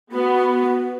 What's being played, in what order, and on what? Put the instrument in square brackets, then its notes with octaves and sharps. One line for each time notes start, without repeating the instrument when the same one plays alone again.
[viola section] B3 [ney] F#4